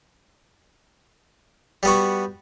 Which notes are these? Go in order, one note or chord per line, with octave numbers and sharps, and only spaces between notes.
G3 B3 F#4